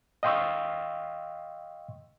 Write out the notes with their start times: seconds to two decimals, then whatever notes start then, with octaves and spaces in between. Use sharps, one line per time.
0.23 D#5 F5 G5 C6 C#6 E6